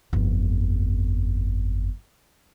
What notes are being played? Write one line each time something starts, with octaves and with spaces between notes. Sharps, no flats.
G1 F2